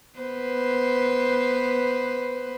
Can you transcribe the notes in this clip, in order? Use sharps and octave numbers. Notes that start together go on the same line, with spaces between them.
B3 B4 C5